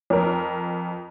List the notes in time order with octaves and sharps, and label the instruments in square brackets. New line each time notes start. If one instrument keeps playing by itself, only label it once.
[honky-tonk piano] F2 A#4